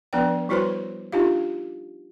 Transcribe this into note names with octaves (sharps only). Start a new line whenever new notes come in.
F3 B3 D4 B4 D5 G5
G3 E4 F#4 B4 C5 C6
D4 D#4 F4 G4 F5